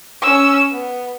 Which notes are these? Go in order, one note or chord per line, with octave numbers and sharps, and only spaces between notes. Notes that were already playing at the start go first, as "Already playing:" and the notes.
C#4 E6
B3